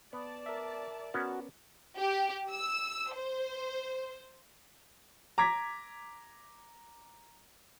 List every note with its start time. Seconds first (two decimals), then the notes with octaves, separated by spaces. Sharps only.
0.13 B3 D5 A5
0.46 A#4 E5
1.14 B3 C#4 F#4 A#4
1.97 G4
2.51 E6
3.13 C5
5.38 A#5 D6 G#6 B6